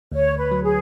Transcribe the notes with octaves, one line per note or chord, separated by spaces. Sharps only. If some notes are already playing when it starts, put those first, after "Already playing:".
D2 C#5
B4
F#3
G#4